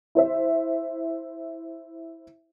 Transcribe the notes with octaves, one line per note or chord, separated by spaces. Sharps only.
E4 C5 E5